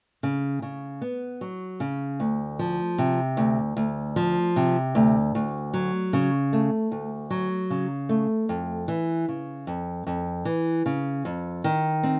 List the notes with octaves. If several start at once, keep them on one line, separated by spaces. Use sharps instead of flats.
C#3
C#3
B3
F#3
C#3
D2
F3
C3
D2
D2
F3
C3
D2
D2
F#3
C#3
A3
D2
F#3
C#3
A3
F2
E3
C#3
F2
F2
E3
C#3
F2
D#3
C4